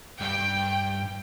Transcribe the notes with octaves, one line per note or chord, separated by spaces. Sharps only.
G2 G5